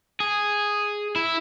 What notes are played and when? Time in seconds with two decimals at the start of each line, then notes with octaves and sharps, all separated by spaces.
0.20 G#4
1.16 E4